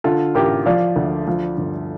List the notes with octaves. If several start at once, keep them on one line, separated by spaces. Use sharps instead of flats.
D3 F4 A4
A1 G4 A#4
F3 D5 F5
D2
F3
G1